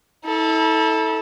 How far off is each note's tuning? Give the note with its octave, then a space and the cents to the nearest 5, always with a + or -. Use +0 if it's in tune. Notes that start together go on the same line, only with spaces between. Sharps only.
E4 -40 A4 +0